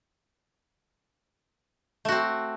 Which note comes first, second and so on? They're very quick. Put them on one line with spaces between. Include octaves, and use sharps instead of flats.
A3 F#4 C4